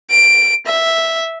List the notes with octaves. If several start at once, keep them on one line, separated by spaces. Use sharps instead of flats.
D7
E5